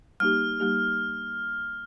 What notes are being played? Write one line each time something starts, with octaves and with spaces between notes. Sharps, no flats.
G3 A#3 D#4 G4 F6
G3 A#3 D#4 G4